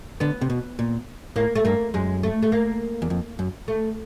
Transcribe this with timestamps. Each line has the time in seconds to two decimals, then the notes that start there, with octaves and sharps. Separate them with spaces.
0.20 D3 B3
0.41 C3
0.50 B2
0.79 A#2
1.36 A2 A#3
1.55 A3
1.65 G2 A#3
1.94 F#2 G#3
2.23 A3
2.42 A3
2.52 A#3
3.02 E2
3.10 F2
3.39 F#2
3.68 A3